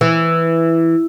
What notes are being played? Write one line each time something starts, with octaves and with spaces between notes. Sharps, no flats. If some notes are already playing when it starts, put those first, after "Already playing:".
E3